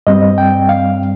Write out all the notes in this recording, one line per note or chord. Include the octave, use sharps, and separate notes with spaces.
G2 G3 C4 D#5
G5
F5